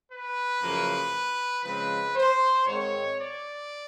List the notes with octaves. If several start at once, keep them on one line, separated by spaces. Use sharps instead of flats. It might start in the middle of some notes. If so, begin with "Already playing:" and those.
B4
F#2 C#3 F3 A#3
C#3 F3 G#3 C4 B4
C5
G#2 D#3 G#3 C4 C#5
D5